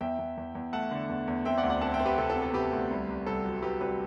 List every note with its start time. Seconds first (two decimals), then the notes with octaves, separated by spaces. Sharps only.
0.01 E2 E5 G5
0.19 E2
0.37 E2
0.55 E2
0.73 A3 F#5 A5
0.91 D3
1.09 E2
1.28 E2
1.45 C4 E5 G5
1.58 D5 F#5
1.64 D2
1.70 D5 F#5
1.81 C4 F#5 A5
1.94 E5 G5
2.00 C4
2.06 G4 B4
2.18 C3 A4
2.30 A4
2.36 C3
2.42 A4
2.54 C3 G4 B4
2.73 D2
2.91 C2
3.09 C2
3.26 C2 A4
3.45 F#3
3.62 F#3 G4 B4
3.81 C2 G4 B4